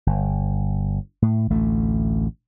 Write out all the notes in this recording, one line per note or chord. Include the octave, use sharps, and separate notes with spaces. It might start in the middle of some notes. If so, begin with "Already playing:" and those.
G1
A2
A1 D2 A3